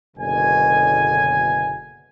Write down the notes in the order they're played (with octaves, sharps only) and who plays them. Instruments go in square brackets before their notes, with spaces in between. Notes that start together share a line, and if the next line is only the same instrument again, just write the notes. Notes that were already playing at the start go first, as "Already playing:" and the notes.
[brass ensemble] F#1 B2 D3 G#5